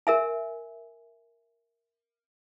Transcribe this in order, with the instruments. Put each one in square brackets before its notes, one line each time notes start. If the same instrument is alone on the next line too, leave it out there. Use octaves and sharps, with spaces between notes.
[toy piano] A#4 E5 G#5